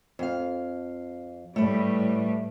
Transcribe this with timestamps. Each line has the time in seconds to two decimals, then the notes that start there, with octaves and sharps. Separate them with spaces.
0.19 F2 F5
1.56 A2 G3 A3 B4